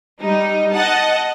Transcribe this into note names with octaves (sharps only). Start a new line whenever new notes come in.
G3 D#4
D#5 F#5 A5